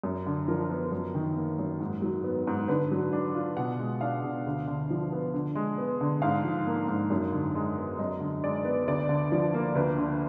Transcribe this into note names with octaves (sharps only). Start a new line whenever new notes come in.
F#2
D3
F3 A#4
B3
F#2
D#3
A#3
F#2
G#2
F#3
B3
G#2
D3 B4
F#3
D4
F4
B2 F#5
G#3
D4 F5
B2
D2
D3
F3
B3
D3
G#3
B3
D3
G#2 F5
F3
A#3
G#2
F#2
D3
G#3
B3
F#2 D#5
D3
G#3 D5
B3
D2 D5
D3
F3
A#3
D2 B4
D3